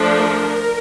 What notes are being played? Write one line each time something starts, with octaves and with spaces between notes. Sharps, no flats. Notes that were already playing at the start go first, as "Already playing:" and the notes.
Already playing: F3 A3 D4
A#4